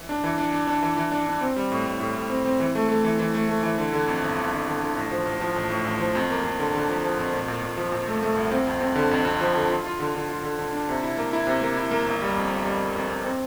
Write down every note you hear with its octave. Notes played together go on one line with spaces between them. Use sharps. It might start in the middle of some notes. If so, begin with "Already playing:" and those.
Already playing: E3
D4
E3
D4
D4
D4
E3
E3
D4
D4
C4
G3
A2
A2
A2
A2
C4
C4
E3
A3
A3
E3
E3
A3
A3
E3
D3
D3
F2
G1
G1
D3
D3
D3
A1
F3
A1
F3
A1
A2
A1
F3
F2
A#3
F2
D3
D3
F3
F3
F2
A#2
A#2
A#2
F3
A#2
A3
A3
C2
C4
F2
C4
D3
F2
F2
F3
D3
F4
F4
D3
D3
F4
D3
D3
D4
C3
E4
A#3
E4
C3
A#3
E4
A#3
G1
G3
F2
G1
G3
G1
F2
F2
C4